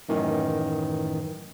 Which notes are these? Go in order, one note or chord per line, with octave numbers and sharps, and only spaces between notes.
F#2 A2 D#3 E3